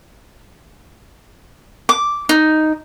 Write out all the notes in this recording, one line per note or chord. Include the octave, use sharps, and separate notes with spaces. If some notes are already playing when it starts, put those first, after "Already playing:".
D6
D#4